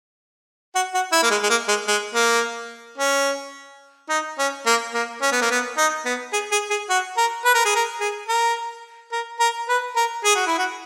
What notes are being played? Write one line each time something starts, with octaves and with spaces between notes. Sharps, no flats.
F#4
F#4
E4
A#3
G#3
G#3
A#3
G#3
G#3
A#3
C#4
D#4
C#4
A#3
A#3
C#4
B3
A#3
B3
D#4
B3
G#4
G#4
G#4
F#4
A#4
B4
A#4
G#4
A#4
G#4
A#4
A#4
A#4
B4
A#4
G#4
F#4
E4
F#4